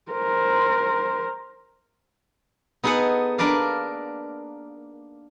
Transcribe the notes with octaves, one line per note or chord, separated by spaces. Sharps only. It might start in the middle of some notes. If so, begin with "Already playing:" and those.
A#4 C5
B3 D#4 G#4 A4 F#5
A#3 D4 A#4 B4 D5 F5